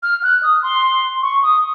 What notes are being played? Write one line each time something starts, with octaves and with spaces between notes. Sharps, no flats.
F6
F#6
D#6
C6
C#6
D#6